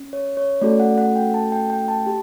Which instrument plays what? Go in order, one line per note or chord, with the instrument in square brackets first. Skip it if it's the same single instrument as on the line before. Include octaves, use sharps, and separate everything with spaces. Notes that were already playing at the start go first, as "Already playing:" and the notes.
Already playing: [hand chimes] C#4
C#5
C#5
A3 C#4 F#4 A4 D5
F#5
F#5
G5
A5
G5
G5
A5
G4 A5